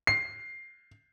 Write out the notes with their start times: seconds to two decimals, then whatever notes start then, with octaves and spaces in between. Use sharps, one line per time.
0.07 C7